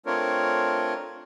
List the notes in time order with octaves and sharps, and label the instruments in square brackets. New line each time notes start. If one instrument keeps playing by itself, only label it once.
[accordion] A3 C4 D4 F4 A#4 C#5